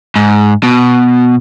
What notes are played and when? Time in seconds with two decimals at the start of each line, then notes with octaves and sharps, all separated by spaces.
0.16 G#2
0.63 B2